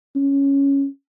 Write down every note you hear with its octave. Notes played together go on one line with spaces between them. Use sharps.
C#4